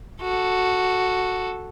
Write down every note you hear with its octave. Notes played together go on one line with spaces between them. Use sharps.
F#4 A4